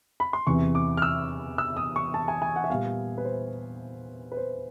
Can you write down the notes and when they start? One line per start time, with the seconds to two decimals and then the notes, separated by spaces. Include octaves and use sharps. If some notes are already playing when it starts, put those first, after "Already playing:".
0.20 B5
0.33 C6
0.47 E2 C3 E3 C#6
0.75 D6
0.97 F6
1.02 E6
1.58 E6
1.77 D#6
1.96 C#6
2.14 A5
2.28 G#5
2.42 G#5
2.56 F#5
2.64 E5
2.69 A#2 G3 B3 F5
3.18 B4
3.25 C5
4.32 B4
4.37 C5